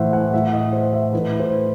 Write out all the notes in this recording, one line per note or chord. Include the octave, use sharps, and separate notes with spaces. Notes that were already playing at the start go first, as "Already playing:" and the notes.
Already playing: A2 E3 C5 E5 F#5
F#5
A2 E3 E5
D#5
C5
E5
A2 E3 B4
C5